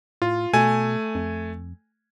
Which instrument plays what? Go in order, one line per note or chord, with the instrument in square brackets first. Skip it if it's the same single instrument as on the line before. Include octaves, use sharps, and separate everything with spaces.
[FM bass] A2 [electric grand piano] F4
[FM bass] B2 [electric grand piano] A3 G#5
[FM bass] F2